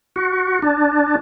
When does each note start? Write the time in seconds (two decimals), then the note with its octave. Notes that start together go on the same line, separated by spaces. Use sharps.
0.16 F#4
0.62 D4